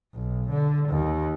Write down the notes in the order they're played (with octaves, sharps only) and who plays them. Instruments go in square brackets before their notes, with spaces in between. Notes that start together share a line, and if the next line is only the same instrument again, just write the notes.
[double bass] B1
D3
D#2